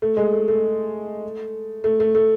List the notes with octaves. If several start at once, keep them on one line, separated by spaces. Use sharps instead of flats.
A3
G#3
A3
A3
A3
A3
A3